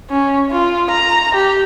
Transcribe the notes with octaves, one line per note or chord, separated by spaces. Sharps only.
C#4
F4
A#5
G4